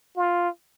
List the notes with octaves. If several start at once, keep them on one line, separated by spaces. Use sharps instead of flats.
F4